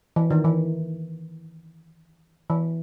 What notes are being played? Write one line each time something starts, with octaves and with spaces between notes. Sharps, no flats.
E3
D#3
E3
E3